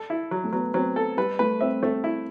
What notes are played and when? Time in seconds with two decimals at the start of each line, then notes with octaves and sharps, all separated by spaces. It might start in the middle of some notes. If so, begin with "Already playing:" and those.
Already playing: A4
0.10 E4
0.31 F#3
0.44 A3
0.52 F#3 B3
0.74 F#3 C4
0.96 A4
1.17 G3 B4
1.39 A3 B4
1.61 C4 E5
1.83 A3 C4
2.04 E4